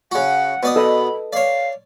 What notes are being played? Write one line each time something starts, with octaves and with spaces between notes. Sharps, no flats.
C#3 F#4 F#5
B2 D5 D#6
A4 B4 D#5 B5
C#5 D5 F5